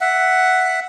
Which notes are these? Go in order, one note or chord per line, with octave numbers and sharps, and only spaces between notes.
E5 F#5